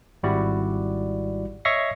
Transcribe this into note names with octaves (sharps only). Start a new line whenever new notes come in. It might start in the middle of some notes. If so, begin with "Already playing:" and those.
G#1 G3 E4 F#4 D5
C#5 D#5 E5 C#6 A#6 C7